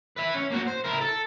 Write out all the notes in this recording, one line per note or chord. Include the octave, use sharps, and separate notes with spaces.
B4 E5
C#4
A#3 F#4
C5
E4 A#4
A4